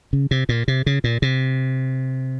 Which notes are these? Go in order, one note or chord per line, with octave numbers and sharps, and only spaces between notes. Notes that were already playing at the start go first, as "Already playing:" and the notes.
C#3
C3
A#2
C3
C#3
A#2
C3